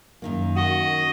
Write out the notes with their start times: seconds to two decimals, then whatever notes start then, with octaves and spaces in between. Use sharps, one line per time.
0.22 F#2 D#3 A#3
0.56 F#4 D#5